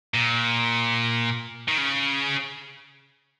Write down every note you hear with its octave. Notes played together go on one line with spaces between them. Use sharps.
A#2
D#3
C#3